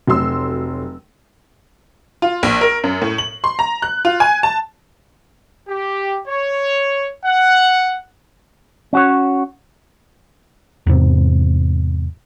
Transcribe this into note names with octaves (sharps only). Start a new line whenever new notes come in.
F1 F#3 A3 C6 E6
F4
A#1
A#4
F#2
A2
F#7
C6
A#5
F#6
F4
G#5
A5
G4
C#5
F#5
C#4 F#4 C#5
E2 G#2 C3